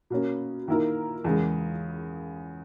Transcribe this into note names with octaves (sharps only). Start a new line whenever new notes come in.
B2 A#3 C#4
D#3 A#3 E4 A#4
E2 C#3 G#3